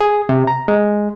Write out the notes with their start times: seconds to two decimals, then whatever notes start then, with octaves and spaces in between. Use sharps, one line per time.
0.01 G#4
0.29 C3
0.47 A#5
0.68 G#3